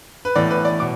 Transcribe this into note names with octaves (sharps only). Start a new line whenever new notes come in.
B4
A2 E3 B3 D5
B4
D5
B2 D6